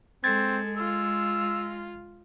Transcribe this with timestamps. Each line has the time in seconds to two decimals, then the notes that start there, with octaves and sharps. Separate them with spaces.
0.24 G#3 C4 A4 G#6 A6
0.77 F4 E6